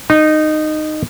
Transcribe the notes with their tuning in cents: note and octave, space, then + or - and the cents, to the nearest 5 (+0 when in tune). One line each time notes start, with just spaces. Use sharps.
D#4 -15